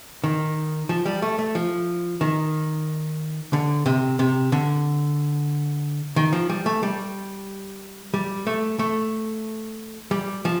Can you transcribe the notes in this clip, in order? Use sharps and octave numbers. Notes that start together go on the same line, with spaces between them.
D#3
F3
G3
A3
A3
F3
D#3
D3
C3
C3
D3
D#3
F3
G3
A3
G3
G3
A3
A3
G3
F3